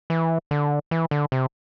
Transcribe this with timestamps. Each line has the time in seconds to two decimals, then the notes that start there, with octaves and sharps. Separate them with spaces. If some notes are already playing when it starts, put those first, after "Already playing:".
0.10 E3
0.51 D3
0.91 E3
1.11 D3
1.32 C3